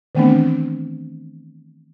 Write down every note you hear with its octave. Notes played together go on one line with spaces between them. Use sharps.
D#3 E3 A3 B3 C4 D4